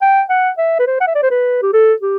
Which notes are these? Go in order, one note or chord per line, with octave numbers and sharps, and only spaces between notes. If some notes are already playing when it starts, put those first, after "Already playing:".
G5
F#5
E5
B4
C5
F#5
E5
D5
C5
B4
G4
A4
G4